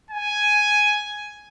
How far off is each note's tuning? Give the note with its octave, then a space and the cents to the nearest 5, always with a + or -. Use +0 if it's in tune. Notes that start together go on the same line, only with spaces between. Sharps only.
G#5 +5